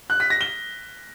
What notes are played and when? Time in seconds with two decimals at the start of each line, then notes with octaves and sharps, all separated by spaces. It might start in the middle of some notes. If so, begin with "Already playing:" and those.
0.10 F#6
0.20 B6
0.30 A#6
0.41 G7